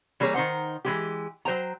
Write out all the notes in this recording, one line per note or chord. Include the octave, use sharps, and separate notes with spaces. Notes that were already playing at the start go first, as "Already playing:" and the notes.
E3 G3 A#3 G#4 C5 C#5
D#3 D#4 C5 F#5
E3 G#3 G4
F#3 C5 G5 A#5